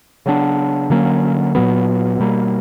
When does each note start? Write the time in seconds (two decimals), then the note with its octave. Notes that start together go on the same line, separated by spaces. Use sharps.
0.26 C#3 F#3 B3 D4
0.90 D3 F#3 A#3 C#4
1.55 A#2 F#3 B3
2.20 B2 G3 A#3